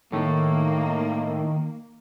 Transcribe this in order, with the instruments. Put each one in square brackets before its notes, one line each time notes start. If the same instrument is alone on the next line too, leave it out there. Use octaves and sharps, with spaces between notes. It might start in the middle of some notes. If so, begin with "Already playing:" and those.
[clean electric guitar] A2 A3 [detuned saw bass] D#3 [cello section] A#3